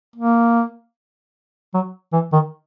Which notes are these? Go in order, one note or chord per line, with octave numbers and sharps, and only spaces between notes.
A#3
F#3
E3
D#3